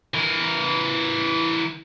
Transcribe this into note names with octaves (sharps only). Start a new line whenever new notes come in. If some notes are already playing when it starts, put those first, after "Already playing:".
E3 A#4